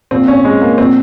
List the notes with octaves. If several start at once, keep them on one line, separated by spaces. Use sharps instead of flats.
A#2 F3 C4
C#4
G#3
A#3
A#2 F3 C4